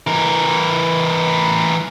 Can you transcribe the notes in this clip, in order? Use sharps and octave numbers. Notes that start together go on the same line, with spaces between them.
E3 A#4